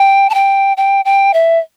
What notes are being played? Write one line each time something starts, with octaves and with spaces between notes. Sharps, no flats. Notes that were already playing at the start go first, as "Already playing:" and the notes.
Already playing: G5
A5
G5
G5
G5
E5